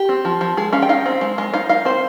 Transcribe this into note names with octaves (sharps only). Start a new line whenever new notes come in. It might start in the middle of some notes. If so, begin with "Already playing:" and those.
Already playing: G4
C4
F3
F3
G#3 G#4
C#4 F5
G5
D#4 F5
C4
G#3
G#3
D#4 F5
D#4 F5
C4 C5